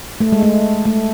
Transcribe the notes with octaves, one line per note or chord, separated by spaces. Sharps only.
A3
G#3
A3
A3